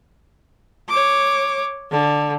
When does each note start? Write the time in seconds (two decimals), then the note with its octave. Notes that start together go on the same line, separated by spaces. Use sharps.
0.89 C#5 D6
1.91 D3